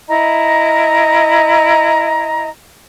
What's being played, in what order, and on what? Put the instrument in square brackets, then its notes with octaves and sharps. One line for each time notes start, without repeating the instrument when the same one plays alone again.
[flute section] E4 D#5 A#5